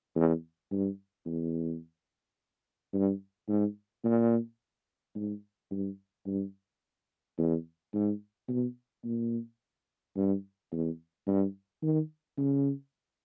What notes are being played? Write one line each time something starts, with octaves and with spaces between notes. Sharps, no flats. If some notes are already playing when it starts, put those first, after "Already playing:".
E2
G2
E2
G2
G#2
A#2
G#2
G2
G2
E2
G#2
B2
A#2
G2
E2
G2
D#3
C#3